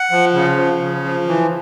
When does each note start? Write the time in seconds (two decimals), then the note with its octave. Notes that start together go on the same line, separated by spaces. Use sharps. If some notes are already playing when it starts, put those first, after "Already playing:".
Already playing: F#5
0.11 F3
0.34 C#3
0.57 F3
0.80 C#3
1.04 F3
1.28 E3